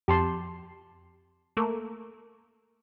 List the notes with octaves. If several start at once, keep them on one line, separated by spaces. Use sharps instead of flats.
F2 G4 A5 C6
A3 A#3